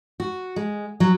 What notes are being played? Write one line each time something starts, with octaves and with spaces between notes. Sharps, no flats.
F#4
G#3
F#3